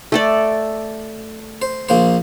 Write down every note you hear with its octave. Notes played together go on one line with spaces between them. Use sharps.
A3 A4 D5
C5
A#1 A#3 C5